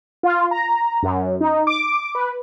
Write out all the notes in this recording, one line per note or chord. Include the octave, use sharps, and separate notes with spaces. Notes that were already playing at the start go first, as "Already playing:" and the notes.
F4
A#5
F#2
D#4
D6
B4